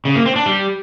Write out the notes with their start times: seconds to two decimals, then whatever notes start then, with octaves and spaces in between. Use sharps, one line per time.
0.05 C#3
0.15 A#3
0.26 C4
0.36 D4
0.46 G3